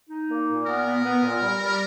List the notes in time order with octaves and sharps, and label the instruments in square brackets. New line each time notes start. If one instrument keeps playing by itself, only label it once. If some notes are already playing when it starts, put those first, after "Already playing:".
[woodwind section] D#4
A#3
A#2
[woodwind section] B3 [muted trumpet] A#4
[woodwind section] B3
B3
A#2
G3
G3